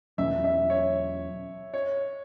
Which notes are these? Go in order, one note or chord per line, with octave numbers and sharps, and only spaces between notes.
E2 B2 F#3 C#4 E5
E5
C#5
C#5